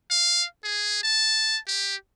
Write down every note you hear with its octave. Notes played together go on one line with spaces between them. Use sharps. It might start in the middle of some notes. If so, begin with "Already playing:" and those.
F5
G#4
A5
G4